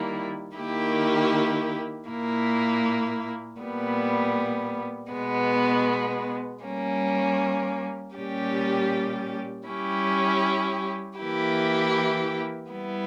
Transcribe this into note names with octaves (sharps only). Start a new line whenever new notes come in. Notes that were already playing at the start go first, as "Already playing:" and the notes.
Already playing: D#3 G3 A#3 E4
D#3 A#3 E4 G4
A#2 A#3 E4
A#2 G3 B3
B2 G#3 B3
G3 A#3 C#4
A#2 G3 C#4 G4
G3 C#4 E4 G4
E3 A#3 E4 G4
G3 B3 E4